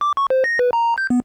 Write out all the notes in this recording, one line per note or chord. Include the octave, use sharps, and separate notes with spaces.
D6
C#6
C5
A#6
B4
A#5
G6
B3